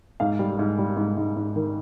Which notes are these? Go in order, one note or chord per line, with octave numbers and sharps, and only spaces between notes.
G#2 F5
G3
G#2
G3
G#2
G#2
G#2
D#3